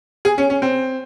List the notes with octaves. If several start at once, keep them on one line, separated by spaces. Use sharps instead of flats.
G#4
C#4
C#4
C4